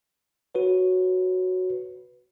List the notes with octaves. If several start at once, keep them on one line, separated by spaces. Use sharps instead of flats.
F#4 B4 C#5